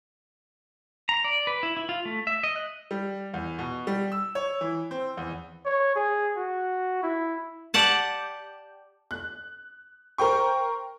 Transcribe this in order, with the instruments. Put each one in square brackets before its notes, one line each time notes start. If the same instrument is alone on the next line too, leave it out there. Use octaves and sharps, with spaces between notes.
[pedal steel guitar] A#5
D5
B4
E4
E4
F4
A3
E5
D#5
F#6
[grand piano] G3
E2
B2
G3
E6
C#5
E3
C4
E2
[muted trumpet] C#5
G#4
F#4
E4
[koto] G4 D5 F#5 A5
[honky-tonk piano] F#6
A#4 C5 G5 C#6